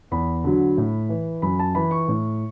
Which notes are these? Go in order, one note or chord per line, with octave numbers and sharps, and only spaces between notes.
E2 B5
D3 F#3
A2
E3
F#2 B5
A5
E3 B5
C#6
A2